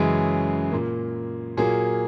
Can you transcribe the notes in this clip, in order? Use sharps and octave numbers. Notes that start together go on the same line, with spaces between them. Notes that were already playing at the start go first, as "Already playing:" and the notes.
Already playing: F#2 C#3 E3 G#3 G#4
A#2 A#3
A#2 F#3 A#3 G#4